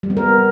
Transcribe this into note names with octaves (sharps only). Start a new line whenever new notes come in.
G3
B3
A#4